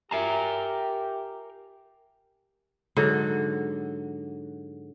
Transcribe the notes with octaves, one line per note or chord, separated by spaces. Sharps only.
F4 G4 A#4 E5 G#5 A#5 C7
G#2 D3 F#3